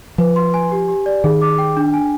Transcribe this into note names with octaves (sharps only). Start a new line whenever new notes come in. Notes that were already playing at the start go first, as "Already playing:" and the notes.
F3 B4
C6
G#5
G4
G4
D5
D#3 G#4
D6
G5
D4
G#5